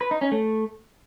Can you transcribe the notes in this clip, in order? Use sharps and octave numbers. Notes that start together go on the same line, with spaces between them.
B4
D#4
C#4
A3